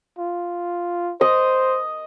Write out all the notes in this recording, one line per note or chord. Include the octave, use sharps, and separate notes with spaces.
F4
C5 D#5